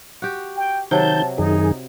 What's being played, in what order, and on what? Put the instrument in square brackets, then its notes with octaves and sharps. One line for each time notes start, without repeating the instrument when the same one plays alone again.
[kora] F#4 G4
[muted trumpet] G5
[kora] C3 F#3 [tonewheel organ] D#3 G6 [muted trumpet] A5
[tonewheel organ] F#2 D#3 G#4 [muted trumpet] D#4